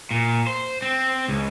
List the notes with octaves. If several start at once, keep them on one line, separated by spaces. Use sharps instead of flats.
A#2
C5
C4
C#2